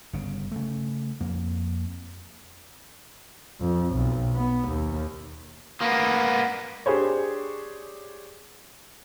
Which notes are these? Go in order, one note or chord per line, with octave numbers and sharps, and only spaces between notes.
G1 C#3
C#3 A3
F2 A#3
F2
B1
B3
D#2
A#3 B3
D4 G4 G#4 C5 C#5